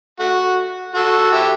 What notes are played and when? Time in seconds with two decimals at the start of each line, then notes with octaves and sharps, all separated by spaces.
0.20 A3 F#4
0.94 F#4 A4
1.32 E4 G4